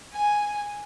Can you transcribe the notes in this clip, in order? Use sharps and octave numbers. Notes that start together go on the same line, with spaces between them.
G#5